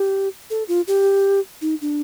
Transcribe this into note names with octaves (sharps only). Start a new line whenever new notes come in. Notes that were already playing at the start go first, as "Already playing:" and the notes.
Already playing: G4
A4
F4
G4
D#4
D4